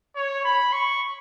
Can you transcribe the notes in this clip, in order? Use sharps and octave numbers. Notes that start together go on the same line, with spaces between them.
C#5
B5
C#6